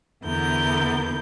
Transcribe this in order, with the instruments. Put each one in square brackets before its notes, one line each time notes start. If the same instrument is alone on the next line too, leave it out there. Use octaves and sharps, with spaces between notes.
[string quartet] E2 D3 B3 A#4 G6